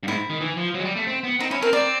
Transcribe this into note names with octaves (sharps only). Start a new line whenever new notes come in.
G2
G#2 E4
D#3
E3
F3
F#3
G#3
G3
A3
C4
B3
C4 D#4
C#4 E4
C4 A#4
C4 D5